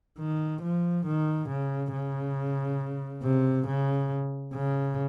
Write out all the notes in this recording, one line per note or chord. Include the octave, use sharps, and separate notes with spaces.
D#3
F3
D#3
C#3
C#3
C3
C#3
C#3